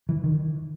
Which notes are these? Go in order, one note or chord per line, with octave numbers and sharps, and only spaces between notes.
E3
D#3